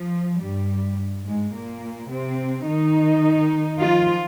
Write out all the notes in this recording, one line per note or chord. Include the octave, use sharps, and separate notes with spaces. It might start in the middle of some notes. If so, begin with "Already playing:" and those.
Already playing: F3
G2 G3
G#2 G#3
A#2 A#3
C3 C4
D#3 D#4
F3 F4